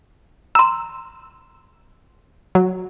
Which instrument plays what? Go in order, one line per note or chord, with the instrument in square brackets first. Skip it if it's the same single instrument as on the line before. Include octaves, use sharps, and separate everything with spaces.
[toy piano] A#5 C6 [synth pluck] E6
[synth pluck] F#3